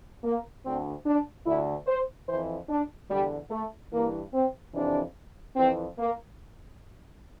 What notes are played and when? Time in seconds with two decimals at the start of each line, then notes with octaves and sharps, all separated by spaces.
0.24 A#3
0.64 D2 D3 C4
1.05 D4
1.46 D2 D3 E4
1.87 C5
2.29 F2 E3 C5
2.69 D4
3.10 E2 D3 G3
3.51 A3
3.92 G2 E3 A#3
4.33 C4
4.74 F2 C3 E3 D4
5.56 F2 E3 C4
5.98 A#3